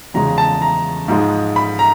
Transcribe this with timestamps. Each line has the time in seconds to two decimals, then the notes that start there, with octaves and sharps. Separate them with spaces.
0.14 E2 C#3 F3 G#3 A#5
0.38 A5
0.62 A#5
1.08 G#2 F3 G#3
1.56 B5
1.79 A#5